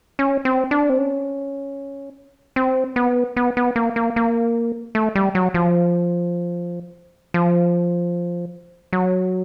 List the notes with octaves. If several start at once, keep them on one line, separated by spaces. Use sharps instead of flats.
C#4
C4
D4
C4
C#4
C4
B3
B3
B3
A#3
A#3
A#3
A3
G3
F#3
F3
F3
F#3